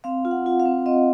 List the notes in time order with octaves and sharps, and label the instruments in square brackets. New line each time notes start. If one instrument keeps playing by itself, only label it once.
[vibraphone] C4 F5
F4
F#5
F4
F5
C4
C4 D#5